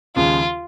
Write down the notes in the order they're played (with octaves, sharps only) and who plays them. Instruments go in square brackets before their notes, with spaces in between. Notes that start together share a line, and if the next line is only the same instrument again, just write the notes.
[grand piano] D#2 C#3 F3 G#3 [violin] F4